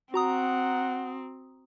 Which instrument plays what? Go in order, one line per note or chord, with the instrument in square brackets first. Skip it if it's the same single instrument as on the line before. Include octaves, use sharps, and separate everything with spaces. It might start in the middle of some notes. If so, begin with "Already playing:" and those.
[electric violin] C4 [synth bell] F#4 A#5 D#6 [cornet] F#5